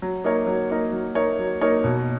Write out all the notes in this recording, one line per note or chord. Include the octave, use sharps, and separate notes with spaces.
F#3
A#3 D#4 A#4 C#5
F#3
A#3 D#4 A#4 C#5
F#3
A#3 D#4 A#4 C#5
F#3
A#3 D#4 A#4 C#5
B2